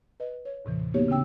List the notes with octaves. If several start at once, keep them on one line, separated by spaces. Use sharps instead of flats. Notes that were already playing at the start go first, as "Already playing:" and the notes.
B4 D#5
C#5
D#2 A2 C3 E3
A#3 B3 D#4 F#4 G4 C#5
C#3 C4 D4 G5 E6